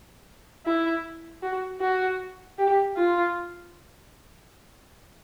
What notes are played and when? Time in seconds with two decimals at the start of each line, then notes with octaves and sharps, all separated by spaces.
0.66 E4
1.43 F#4
1.81 F#4
2.58 G4
2.97 F4